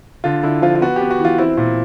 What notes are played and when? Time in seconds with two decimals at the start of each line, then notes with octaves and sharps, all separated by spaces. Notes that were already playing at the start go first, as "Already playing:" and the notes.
0.24 D3 F4
0.43 D3 E4
0.62 F3 F4
0.76 F4
0.81 B3 F#4
0.96 G4
1.01 B3
1.11 F#4
1.20 E3 F4
1.38 C4 E4
1.57 A#2